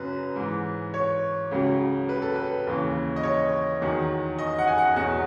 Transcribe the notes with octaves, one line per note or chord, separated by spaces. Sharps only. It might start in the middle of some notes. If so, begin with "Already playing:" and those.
Already playing: F#2 C#3 F#3 B4
G#2 E3
C#5
C#2 C#3 F#3
B4
A4
B4
D#2 C#3 E3
D#5
C#5
E2 D#3 F#3
D#5
F#5
G#5
F#5
E2 B2 F#3 F#5